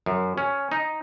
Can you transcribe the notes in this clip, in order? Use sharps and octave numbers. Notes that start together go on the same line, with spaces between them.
F#2
C#4
D#4